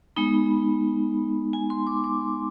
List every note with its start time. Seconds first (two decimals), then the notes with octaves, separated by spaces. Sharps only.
0.16 G#3 B3 D#4 B5
1.53 G#5
1.70 C6
1.87 D6
2.04 D6